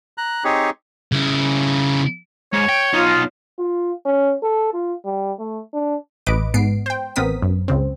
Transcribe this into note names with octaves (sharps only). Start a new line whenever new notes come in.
A#5 F#6
C4 D#4 G4 G#4 C#5
C#3 E4
G#2 C#5
G5
B1 D#4 F4
F4
C#4
A4
F4
G3
A3
D4
A1 B4 D#5 D6 D7
G#2 B3 C7 D7
C5 G5
A1 B3 C4 A#4 D#6 B6
F#2
C#2 C#3 C4